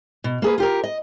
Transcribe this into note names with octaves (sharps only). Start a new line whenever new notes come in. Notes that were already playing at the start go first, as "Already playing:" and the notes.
B2
A#3 G#4 B4
F4 G4 A#4
D#5